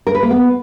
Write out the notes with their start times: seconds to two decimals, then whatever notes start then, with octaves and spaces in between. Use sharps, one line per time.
0.07 A#4
0.15 B4
0.23 A#3
0.31 B3